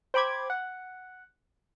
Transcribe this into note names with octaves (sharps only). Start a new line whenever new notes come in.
C5 G5 B5 D6 G#6
F#5